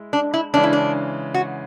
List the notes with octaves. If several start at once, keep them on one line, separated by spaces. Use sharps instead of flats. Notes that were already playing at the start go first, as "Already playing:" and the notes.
Already playing: G#3 E4
D4
E4
C#3 E3 G#3 D4
E4
D4
F#4